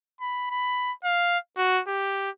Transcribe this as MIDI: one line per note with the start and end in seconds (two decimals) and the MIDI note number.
0.21 0.46 83
0.51 0.92 83
1.04 1.38 77
1.57 1.81 66
1.88 2.30 67